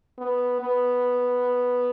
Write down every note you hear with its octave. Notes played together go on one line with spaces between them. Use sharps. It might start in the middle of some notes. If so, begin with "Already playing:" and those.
B3
B3